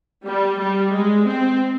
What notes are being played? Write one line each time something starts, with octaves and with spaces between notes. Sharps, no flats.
G3
G3
G#3
C4